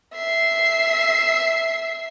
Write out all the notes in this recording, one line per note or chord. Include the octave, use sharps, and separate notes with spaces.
E5 C7